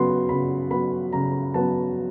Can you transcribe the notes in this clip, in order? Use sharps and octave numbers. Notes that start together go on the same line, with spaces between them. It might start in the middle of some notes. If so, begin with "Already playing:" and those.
Already playing: C#3 F#3 B3 C6
C#3 B5
F#3 B3 B5
C#3 A#5
F#3 B3 A5